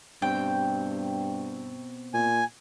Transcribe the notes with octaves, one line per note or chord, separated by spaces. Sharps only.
G2 B2 C4 G5
A#2 G#5